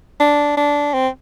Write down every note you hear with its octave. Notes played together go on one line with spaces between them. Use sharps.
D4
D4
C4